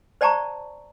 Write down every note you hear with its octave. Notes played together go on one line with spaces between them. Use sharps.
C5 D5 G5 A5 A#5 C#6